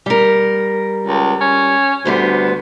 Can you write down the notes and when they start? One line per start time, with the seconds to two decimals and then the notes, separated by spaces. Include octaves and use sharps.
0.06 G3 A#4
1.06 C#2
1.41 C#4
2.05 D2 G3 B3 C5